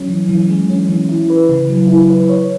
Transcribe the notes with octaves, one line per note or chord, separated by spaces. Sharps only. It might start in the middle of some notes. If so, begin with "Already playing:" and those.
Already playing: F#3 C#4
E3
E3
G#3
C#4
E3
E4
B4
C#3
F#3
E4
B4
C#5